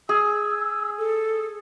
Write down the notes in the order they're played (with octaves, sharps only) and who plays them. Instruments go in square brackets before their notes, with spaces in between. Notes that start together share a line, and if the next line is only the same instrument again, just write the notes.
[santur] G#4 [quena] E6
[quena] A4